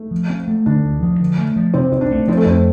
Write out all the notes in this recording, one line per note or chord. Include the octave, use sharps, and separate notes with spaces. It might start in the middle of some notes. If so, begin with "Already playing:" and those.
Already playing: A3
F3
C4
A3
D3 D4
D2
F3
D3
A3
F3
C3 C4
C2 C4
D4
A3
F3 C4
A3
F2 C4